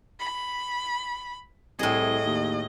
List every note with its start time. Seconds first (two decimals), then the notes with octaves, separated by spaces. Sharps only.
0.19 B5
1.79 C2 A2 G#4 D#5
2.26 D#2